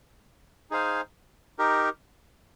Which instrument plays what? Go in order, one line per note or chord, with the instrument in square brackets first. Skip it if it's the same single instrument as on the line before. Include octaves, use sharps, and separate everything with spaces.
[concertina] D#4 G#4 C5 F5 G#5
D#4 G4 A#4